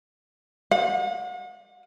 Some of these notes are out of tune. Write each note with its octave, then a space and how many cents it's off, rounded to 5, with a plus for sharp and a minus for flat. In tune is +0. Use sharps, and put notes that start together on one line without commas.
F#5 -40